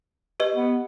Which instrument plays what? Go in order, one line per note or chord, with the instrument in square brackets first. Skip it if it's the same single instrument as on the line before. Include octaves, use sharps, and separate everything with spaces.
[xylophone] G4 B4 D#5
[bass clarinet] B3